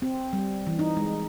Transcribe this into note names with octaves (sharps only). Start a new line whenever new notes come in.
C4
G3
E3
D#4
G#3